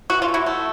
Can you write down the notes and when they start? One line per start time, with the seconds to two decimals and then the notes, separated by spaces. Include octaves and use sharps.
0.10 E3 F#4
0.22 F4
0.29 A3
0.34 E4 F#4
0.46 A3